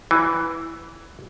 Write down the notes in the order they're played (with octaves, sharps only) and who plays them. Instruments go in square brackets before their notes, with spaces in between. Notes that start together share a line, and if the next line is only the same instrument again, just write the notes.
[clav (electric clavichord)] E3